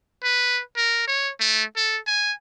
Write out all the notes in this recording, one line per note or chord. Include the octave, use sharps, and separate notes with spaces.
B4
A#4
C#5
A3
A4
G#5